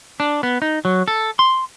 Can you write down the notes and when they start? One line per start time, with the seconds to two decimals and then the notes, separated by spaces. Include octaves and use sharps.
0.20 D4
0.43 B3
0.62 D#4
0.85 F#3
1.08 A4
1.39 C6